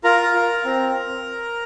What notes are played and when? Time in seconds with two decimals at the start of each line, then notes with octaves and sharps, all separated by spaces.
0.04 F4 A#4 A#5
0.34 F4
0.64 C4